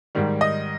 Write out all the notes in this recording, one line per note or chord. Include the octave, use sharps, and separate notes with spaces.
G#2 D#3 G3
D#5